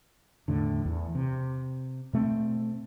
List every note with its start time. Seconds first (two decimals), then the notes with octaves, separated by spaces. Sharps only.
0.48 E2 A2 D3
0.86 E2
1.15 C3
2.13 B2 A3 A#3 C4